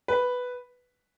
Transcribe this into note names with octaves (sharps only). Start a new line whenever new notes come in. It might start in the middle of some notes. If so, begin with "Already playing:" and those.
B4